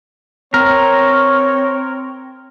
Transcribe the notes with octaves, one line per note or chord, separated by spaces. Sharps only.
C4 A#4 C#5